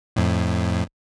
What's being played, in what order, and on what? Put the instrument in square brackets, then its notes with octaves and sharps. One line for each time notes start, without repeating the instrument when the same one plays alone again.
[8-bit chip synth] F2 A2